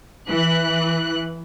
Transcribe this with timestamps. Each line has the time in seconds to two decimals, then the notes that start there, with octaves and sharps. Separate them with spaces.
0.28 E3 F#6